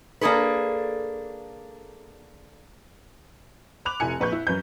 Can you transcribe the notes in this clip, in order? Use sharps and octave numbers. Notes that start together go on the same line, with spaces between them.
A#3 D4 G#4 A4 B4
B5 D6 F#6 F7
F1 E4 G#5 C#7
A#1 B4 C#6 G6
E4
F#2 B4 G6